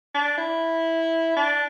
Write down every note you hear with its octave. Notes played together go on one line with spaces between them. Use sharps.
D4
E4
D4